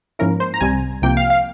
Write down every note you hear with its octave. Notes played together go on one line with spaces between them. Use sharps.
G#2 F3 A#3 C#4 E4 A#4
C5
A#5
C2 C3 G3 C4 G#5
C2 C3 F3 A#3 G5
F5
F5